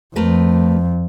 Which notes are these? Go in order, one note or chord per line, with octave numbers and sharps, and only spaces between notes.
F2 A3 A#4 B4